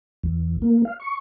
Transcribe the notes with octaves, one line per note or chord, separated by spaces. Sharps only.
E2
A#3
F5
C#6